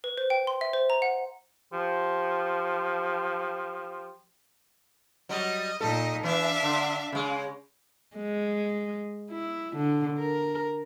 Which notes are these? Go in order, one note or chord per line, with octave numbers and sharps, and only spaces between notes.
B4
C5
G5
C6
E5
C5
A#5
F#5
F3 G4
F#3 G3 D#5
A#2 D#4 A4 D#5
E3 D4 E5 F5
D3
C#3 G#3
G#3
E4
D3
A#4